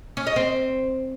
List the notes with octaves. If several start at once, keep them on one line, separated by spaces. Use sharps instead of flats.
C#4
D#5
C4